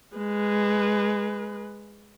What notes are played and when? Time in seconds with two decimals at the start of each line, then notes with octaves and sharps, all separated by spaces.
0.17 G#3 B4